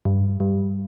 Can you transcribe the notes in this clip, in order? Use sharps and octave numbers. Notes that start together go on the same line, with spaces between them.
G2
G2